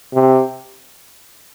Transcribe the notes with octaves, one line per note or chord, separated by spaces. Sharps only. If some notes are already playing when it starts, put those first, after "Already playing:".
C3